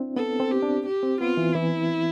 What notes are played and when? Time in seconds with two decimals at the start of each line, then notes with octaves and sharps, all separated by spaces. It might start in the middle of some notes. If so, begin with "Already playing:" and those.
Already playing: C4 D4 E4
0.16 B3 A4
0.40 C4
0.51 G4
0.62 D4
0.85 G4
1.03 C4
1.20 B3 F4
1.37 E3
1.54 E3 E4